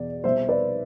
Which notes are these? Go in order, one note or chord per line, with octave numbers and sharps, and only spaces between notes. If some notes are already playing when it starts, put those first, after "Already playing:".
Already playing: E2 B2 D5
C2 B2 C5 E5
B4 D5